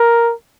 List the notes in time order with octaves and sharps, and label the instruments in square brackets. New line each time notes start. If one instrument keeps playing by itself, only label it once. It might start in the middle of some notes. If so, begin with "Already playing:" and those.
Already playing: [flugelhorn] A#4